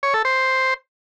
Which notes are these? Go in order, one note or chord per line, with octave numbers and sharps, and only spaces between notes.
C#5
A4
C5